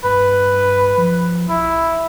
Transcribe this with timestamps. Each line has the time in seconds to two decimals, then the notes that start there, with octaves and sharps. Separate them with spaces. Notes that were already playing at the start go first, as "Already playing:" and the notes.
0.04 G2 B4
0.98 F3
1.49 B1 E4